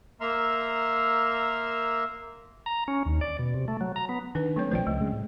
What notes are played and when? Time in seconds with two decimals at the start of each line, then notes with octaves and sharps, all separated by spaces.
0.21 A#3 E5 A#5 C6 E6 F6
2.66 A#5
2.88 C#4
3.06 D#2
3.21 D5
3.39 B2
3.54 C3
3.68 A3
3.81 F#3
3.96 A#5
4.09 B3
4.35 D#3 D4 B4
4.56 F#3 A3 C4 C#5
4.71 B1 F3 A3 C5 D5 G5
4.87 C#2 A3
5.00 C#3 G#3
5.13 A2